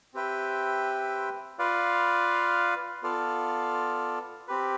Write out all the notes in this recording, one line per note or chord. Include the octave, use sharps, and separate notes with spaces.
C4 G4 B4 E5 G5
F4 B4 D5 F5
B3 F4 A4 D5 F5
C4 G4 B4